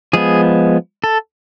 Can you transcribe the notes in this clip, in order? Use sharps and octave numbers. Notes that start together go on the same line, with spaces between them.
F3 G#3 B3 G#4
A4